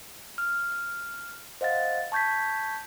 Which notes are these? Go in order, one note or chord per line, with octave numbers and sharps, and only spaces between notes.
F6
C5 D#5 F5 F#5 A6
A5 C#6 G6 G#6 B6